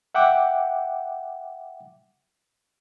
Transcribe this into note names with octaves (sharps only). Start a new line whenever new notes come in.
E5 F#5 G5 D6